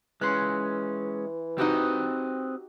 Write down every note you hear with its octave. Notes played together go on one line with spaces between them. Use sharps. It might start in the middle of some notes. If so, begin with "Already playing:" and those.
E3 G#3 C#4 C6 F#6
C4 D#4 F#4 G4 B4 D#5